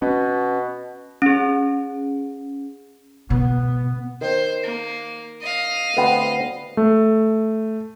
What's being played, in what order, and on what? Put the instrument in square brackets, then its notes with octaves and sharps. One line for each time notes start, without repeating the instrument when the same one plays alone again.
[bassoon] B2 [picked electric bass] C#4
[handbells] C#4 G#4
[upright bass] B2 [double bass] B3
[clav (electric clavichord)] D#3 [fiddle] C5
[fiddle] A#3
D#5 F5
[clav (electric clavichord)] D2 B3 C4
[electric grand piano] A3